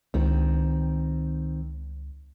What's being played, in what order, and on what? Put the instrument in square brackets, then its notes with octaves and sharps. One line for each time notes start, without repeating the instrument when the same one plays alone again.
[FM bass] C#2 [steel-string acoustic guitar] D#3 C4